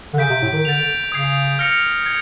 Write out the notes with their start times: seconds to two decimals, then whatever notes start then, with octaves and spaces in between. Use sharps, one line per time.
0.13 D3
0.18 C#3 G6 B6 D7
0.30 C3
0.42 A2
0.53 D#3
0.65 D3 A6 D7 F7
1.12 C#3 D#6 G#6 C7
1.59 F6 A#6 C#7 F7
2.06 G#6